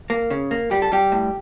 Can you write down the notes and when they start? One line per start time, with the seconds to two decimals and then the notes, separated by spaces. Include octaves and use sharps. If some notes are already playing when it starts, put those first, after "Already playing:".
0.10 A#3
0.30 C#3
0.51 A#3
0.71 G3 G4
0.82 A4
0.92 G3 G4
1.12 A2